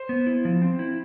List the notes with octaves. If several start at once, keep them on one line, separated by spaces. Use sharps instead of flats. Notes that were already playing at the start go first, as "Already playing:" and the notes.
Already playing: C5
B3
E4
F3
C4
E4